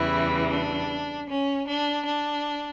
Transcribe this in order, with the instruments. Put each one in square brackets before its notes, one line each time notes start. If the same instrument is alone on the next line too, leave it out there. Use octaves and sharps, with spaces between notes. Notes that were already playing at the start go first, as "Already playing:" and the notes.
Already playing: [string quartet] E2 C#3 E3 G3 E4
D4
C#4
D4
D4